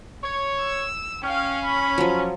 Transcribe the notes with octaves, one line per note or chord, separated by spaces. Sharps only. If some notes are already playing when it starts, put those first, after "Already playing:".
C#5
E6
C#4 F5 G5
B5
F3 F#3